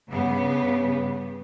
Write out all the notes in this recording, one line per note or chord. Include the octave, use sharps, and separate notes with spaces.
G2 C#3 B3